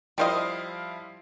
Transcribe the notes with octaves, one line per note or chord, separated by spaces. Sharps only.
F3 G3 E4 C5 D#5 F5